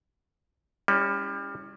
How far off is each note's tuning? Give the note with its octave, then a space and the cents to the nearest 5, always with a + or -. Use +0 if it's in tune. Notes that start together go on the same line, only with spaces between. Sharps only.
G3 +30 C#4 +0 E4 -20